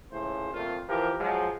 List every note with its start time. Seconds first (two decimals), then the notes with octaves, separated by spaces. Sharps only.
0.12 C#2 A2 C#3 C5
0.52 F2 A#2 A3 F4
0.87 E3 F3 G4 A#4
1.18 F3 F#3 G#3